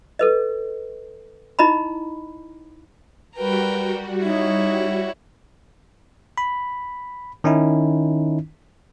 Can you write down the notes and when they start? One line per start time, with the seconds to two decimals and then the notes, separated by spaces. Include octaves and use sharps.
0.19 A4 B4 D#5
1.59 D#4 E4 D#5 A#5 B5
3.37 G3 F#4 A#4 B4 G5
4.23 D#4 E4 C#5
6.38 B5
7.44 D#3 C#4 D#4 E4